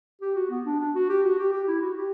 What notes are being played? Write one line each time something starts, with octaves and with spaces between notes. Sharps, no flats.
G4
F#4
B3
D4
D4
F#4
G4
F#4
G4
G4
E4
F#4
G4